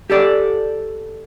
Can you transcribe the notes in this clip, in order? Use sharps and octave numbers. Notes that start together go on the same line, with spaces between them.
G4 A4 D5